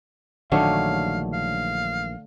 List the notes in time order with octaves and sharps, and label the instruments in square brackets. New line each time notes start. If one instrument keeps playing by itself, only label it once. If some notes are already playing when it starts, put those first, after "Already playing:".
[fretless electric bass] A#1 D#3 F#3 [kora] D3 A3 C#5 [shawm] F5
[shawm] F5